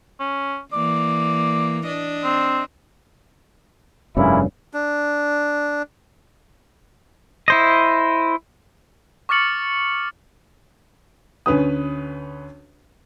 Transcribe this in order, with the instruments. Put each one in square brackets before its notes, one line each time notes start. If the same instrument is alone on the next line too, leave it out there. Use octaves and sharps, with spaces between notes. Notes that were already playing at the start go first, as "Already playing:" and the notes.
[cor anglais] C#4
[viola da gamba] E3 A#3 [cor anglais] D5
[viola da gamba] D4 D#5
[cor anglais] C4
[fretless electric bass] F1 G2 C#4 [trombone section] A#2 C#3 E4
[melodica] D4
[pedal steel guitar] E4 C5 D#5
[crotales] C#6 D6 F6 A6 C#7 F#7
[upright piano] D2 C#4 B4 D#6